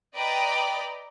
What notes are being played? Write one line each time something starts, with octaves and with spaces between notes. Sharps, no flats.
B4 D5 D#5 G5 A#5 D7